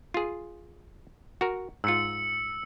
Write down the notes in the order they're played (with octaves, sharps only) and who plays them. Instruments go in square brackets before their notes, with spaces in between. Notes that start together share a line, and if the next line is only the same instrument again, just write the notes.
[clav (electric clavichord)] F4 G#4
F#4 A#4
[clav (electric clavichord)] G#2 F4 [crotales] E6 C#7